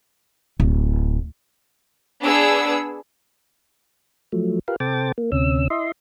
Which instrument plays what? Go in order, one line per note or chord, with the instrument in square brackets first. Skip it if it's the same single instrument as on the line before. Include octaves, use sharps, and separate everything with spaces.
[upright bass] D1
[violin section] B3 D4 G#4 E6
[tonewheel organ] F3 F#3 A3
F4 G4 A#4 B4 F5
C3 A4 C5 G5 D6 A6
A#3
D2 C3 C#4 E6
E4 D#5 E5 C6